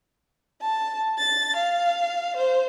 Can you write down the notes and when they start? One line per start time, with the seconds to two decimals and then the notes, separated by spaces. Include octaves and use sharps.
0.62 A5
1.18 A6
1.56 F5
2.36 C5